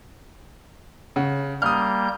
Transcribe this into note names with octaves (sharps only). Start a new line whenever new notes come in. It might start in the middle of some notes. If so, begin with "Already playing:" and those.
C#3 F#5
G3 A#3 D#6 F6 G6